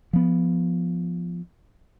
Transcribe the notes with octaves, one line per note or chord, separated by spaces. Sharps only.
F3 B3